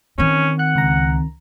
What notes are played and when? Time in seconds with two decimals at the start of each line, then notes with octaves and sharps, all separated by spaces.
0.18 D#3 C4 C#4
0.59 F#5 F#6
0.76 C#2 A#5